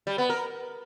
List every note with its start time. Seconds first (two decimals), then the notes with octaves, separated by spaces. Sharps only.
0.07 G3
0.18 B3
0.30 A#4